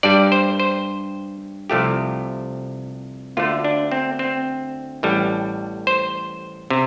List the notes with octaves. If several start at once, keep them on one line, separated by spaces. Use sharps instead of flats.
G2 G3 D5
C5
C5
C2 C3 F3 A3 G4
D2 D3 A3 F4
D4
C4
C4
A1 A2 G3
C5
C3